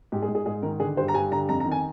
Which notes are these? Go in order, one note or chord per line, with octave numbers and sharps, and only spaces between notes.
G#2 G4
G#4
G#2
G#4
G#2 G#4
D#3 A#4
D3 G#4
G2 C5
A#5
G2 G#5
D3 A#5
F2 A#5
A#5
D#3
G#5